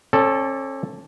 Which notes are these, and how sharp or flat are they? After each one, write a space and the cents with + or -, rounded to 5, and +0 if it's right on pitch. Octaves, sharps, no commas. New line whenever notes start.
C#4 -40 A4 +0 D5 -15